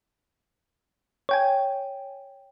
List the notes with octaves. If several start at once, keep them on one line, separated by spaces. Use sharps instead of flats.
C#5 G5 G#5